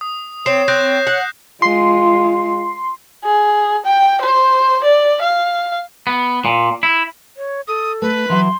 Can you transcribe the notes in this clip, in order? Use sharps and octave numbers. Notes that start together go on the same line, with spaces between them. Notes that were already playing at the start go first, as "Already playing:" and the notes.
D#6
C4 C#5 C7 E7
C4 F#6 G6 A#6
F#5
G#3 F4 C6
G#4
G5
C5
D5
F5
B3
A#2
E4
C#5
A4 D#6
A3 B4
E3 F#3 C6